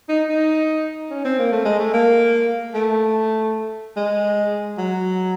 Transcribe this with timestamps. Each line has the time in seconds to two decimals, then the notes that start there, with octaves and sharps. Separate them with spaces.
0.09 D#4
0.29 D#4
1.10 C#4
1.25 C4
1.39 A#3
1.52 A3
1.65 G#3
1.79 A3
1.93 A#3
2.74 A3
3.97 G#3
4.78 F#3